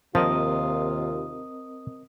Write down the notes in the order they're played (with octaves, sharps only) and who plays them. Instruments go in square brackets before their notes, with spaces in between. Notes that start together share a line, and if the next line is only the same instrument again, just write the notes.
[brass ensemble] D#2 C3 F4 [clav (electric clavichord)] F3 [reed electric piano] C4 A#4 D#5 [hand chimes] D#6